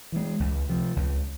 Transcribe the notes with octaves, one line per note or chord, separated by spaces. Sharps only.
E3 G#3
C#2
C3 F3
C#2